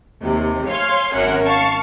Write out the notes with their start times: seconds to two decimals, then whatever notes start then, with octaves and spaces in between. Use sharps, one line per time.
0.20 D#2 C3
0.68 C#5 F5 G#5 C6
1.14 G#1 F#2 C#4 A#4 F#5
1.46 F5 A5 C#6